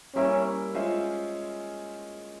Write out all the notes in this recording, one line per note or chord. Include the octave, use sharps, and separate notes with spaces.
G3 A#3 C#4 E4 A#4 E5
G#3 C#4 F4 C5 E5